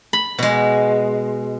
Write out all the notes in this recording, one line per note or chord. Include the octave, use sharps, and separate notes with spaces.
B5
B2 G#3